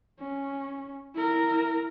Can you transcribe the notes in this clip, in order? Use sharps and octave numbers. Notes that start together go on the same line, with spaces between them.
C#4
E4 A#4